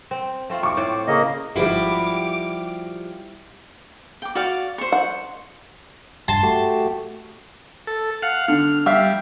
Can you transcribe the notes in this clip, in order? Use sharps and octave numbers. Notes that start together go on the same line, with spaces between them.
C4
A3 C4 F4
C#6 D6
A2 C5 D5
C#3 A#3 D#5
G#1 G#2 F3 G3 E4 F#4 G4 D6
G5 D6
F#4 D5 F5
C5 C#6
F#5
G2 A5 C6
A3 F#4 G4
A4
F5 F#5
D3 F6
G3 E5 F5